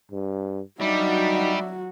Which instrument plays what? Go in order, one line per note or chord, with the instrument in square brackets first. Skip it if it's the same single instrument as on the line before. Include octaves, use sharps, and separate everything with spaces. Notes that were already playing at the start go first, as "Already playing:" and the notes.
[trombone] G2
[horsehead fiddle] F#3 F#4 [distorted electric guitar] G3 [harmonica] D4 E5 [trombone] D#4